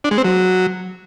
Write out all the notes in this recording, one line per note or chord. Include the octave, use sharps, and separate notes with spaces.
D4
G#3
C4
F#3